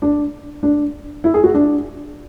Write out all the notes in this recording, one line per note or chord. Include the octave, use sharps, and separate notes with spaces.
D4
D4
E4
G#4
F#4
D4